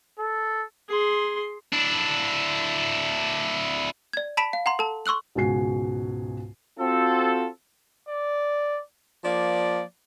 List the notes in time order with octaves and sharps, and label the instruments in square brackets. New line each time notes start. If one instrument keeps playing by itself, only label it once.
[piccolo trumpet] A4
[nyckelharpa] G#4 C6
[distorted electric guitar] D4 E4
[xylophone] D5 G#6
A5 B5 B6 D7 E7
F5
F#5 A#5 C6
A4 A5
C6 C#6 E6 F#6 F#7
[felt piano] C#2 G#2 B2 F#4 G#5 C7
[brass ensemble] C4 F4 F#4 A4
[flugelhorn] D5
[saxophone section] F3 A#3 D5